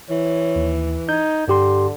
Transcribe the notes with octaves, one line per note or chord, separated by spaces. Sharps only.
E3 C#5
D#2
D#4 G6 G#6
G2 D3 G4 C6